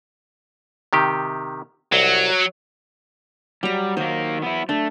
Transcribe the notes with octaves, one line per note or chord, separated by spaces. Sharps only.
C3 D#3 G4
C2 F#3
F#3 G3 A#5
D#3 A#3 C5
B3 E4
A3 D4